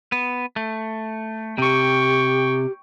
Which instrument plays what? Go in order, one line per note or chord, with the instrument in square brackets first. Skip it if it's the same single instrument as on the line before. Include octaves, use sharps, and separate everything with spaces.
[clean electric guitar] B3
A3
[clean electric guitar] C3 [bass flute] G4 [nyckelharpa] G5 C#6